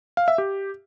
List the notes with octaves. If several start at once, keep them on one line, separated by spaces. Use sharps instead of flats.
F5
E5
G4